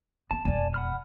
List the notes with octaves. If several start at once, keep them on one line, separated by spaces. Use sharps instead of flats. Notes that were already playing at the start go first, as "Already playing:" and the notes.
B3 C4 A5
E1 F2 D5 G#5 A5
F#5 B5 F6